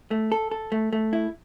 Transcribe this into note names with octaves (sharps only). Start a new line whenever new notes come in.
A3
A4
A4
A3
A3
E4